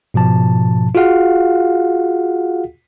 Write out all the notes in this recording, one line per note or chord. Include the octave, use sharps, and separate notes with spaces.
G#2 B2 F3 A5
F4 F#4 G#4 F5 F#5